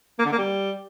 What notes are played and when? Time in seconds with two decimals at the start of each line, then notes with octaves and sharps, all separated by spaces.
0.19 A#3
0.26 D3
0.32 A#3
0.38 G3